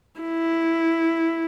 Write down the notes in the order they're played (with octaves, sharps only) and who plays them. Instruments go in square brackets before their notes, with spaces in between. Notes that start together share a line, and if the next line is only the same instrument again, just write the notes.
[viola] E4